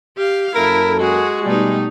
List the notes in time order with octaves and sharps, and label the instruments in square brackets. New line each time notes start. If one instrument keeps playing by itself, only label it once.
[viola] G4 F5
[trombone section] F#2 A#3 A4 [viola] E4 [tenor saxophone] A#4
[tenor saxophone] G#3 [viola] F#4 G#4
[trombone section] B2 G3 [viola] A3 D#4